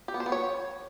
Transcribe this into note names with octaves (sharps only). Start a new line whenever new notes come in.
G4
B3
C5
B3
C#5